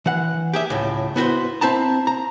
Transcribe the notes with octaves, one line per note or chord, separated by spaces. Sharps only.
E3 F#5
G4 G#4 E5
C#2 A2
B3 E4 F#4 B4 C5
C4 E4 A5 A#5
A#5